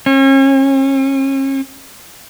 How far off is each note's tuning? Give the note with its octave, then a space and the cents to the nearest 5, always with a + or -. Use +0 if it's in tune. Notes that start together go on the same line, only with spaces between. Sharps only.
C#4 -40